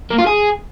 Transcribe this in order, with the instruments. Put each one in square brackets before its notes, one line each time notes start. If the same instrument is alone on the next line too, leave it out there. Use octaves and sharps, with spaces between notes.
[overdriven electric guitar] A#3
F4
G#4